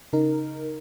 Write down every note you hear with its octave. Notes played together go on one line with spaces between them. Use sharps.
C#3 D#4 A#4